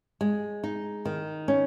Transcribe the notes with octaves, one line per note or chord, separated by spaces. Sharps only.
G#3
D#4
D#3
C#4